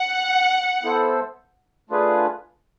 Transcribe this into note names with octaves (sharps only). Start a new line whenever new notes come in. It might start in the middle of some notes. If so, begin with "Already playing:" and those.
Already playing: F#5
B3 E4 A4 C5
A3 D4 F4 G#4 B4